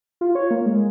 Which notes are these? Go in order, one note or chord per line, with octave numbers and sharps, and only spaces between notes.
F4
C#5
A#3
G#3